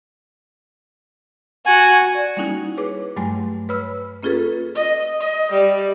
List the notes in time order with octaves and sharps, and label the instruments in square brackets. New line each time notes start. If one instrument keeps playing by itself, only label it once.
[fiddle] F#4 [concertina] G#5
[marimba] D5
G3 A#3 C#4 D#4 E4 F#4
G#4 B4 C#5 D6
G2 F#3 G3 A3 G#5 C6
B4 C#5 B5 E6 F6
A#3 C#4 F4 G#4 A4 B4
[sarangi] D#5
D#5
G3